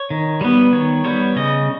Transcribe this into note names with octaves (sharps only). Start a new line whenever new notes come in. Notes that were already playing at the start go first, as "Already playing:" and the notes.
Already playing: C#5
D#3
G3 B3
D#3 C#5
G3 B3 C#5
C#3 D#5